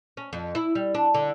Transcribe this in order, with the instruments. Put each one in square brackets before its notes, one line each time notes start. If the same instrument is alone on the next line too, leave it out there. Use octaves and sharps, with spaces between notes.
[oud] C#4
F2
E4
G3
D4
D3